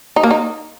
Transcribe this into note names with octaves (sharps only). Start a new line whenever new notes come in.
D#4
A#3
D#4